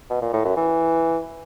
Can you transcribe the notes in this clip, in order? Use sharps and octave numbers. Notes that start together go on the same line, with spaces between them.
B2
A#2
A2
F#2
E3